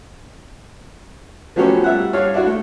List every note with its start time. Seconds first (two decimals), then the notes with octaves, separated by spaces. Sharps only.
1.56 F3 F#3 A3 B3 C#4 G4
1.84 G3 E5 F#5
2.13 G2 C#5 F5
2.34 D4 E4 F#4
2.46 A3